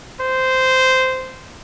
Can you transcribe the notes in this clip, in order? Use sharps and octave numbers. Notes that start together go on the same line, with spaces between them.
C5